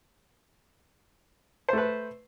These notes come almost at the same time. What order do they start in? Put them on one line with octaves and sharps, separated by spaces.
C5 A3 B4